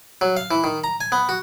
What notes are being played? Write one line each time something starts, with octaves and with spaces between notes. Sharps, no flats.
F#3
F5
E3
D#3
A#5
G#5
B3
F#4